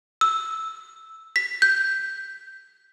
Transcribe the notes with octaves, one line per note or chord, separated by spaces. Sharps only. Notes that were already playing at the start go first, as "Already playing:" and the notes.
E6
B6
G6